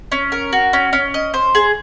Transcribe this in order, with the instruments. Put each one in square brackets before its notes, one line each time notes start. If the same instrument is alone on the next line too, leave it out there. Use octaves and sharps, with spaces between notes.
[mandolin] C#4
A#4
F#4
C#4
C#4
D#5
C5
G#4